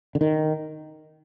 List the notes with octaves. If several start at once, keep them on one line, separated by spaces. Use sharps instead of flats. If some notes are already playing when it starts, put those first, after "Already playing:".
D3
D#3